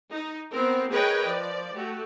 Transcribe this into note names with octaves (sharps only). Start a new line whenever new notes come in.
D#4
B3 C4 A#4
G#4 A#4 B4 C#5 D#5 G5
F3 D5
A3 F#4 G4